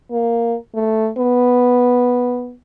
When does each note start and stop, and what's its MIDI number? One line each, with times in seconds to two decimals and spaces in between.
0.11 0.55 58
0.74 1.08 57
1.17 2.52 59